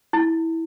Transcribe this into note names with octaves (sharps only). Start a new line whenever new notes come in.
E4